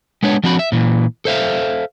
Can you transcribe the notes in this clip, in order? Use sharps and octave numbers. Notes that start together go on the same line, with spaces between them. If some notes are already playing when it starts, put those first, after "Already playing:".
G#3 B3 D4 C#5
F3 C4 D4 F#4 B5
E5
A#2 E3
A4 C5 E5 F5